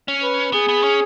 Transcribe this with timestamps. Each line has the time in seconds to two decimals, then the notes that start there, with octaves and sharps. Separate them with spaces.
0.08 C#4
0.23 B4
0.53 B3 G#4
0.68 B3
0.84 C#4